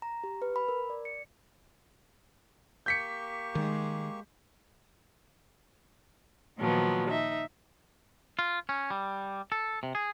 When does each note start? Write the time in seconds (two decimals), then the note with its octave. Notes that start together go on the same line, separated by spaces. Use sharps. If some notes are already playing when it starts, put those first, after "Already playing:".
0.02 A#5
0.24 G4
0.42 B4
0.56 B5
0.68 A#4
0.90 D5
1.05 C#7
2.86 A#3 G4 C#6 G6 B6 C#7
3.55 D#3 G#3
6.58 A#2 D#3 F3 F#3 B3
7.09 D#4 E5
8.39 F4
8.69 C#4
8.90 G3
9.52 A4
9.83 C3
9.95 G#4